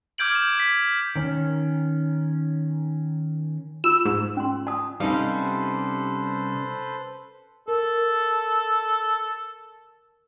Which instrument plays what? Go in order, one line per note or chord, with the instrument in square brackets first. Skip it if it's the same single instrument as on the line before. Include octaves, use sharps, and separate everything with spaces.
[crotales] D6 F6 G6 G#6 D7 F#7
E7
B6
[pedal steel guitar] D#3 C#4
[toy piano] F4 [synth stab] E6
[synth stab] G#2
[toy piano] C#4 C6
A5 D#6
[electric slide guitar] C3 G3 [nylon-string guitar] C#4 D#4 F5 [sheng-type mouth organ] A4 B4 C5
[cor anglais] A4 [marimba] A#4